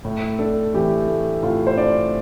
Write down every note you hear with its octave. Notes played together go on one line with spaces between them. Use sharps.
A2
D4 A4
E3 G4
A3
A2 F4
C5
D4 D5